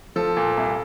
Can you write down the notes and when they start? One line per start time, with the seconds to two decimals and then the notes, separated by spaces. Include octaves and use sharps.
0.16 F3 A4
0.37 A#2
0.57 C2